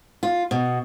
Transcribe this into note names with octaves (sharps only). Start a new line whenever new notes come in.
F4
B2